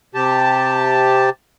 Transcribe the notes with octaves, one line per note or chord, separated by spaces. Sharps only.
C3 G4 A5